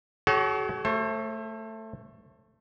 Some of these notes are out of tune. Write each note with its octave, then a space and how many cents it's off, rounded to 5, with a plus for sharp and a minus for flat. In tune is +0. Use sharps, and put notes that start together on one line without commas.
F#4 +40 A4 -45 C#5 +0
A3 +10 C5 +40